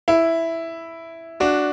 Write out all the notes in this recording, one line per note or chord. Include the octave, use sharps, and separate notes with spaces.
E4
D4 F#4